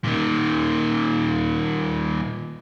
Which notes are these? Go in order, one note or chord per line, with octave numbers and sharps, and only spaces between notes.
A#2 D#3